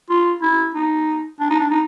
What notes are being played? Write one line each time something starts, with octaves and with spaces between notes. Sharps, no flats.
F4
E4
D#4
D4
D#4
D4
D#4